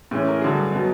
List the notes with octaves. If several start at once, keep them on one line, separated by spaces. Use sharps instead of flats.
A2 E3 G#3 C#4
A#4
G2 D3 F#3 G#4
B2 F#3 B3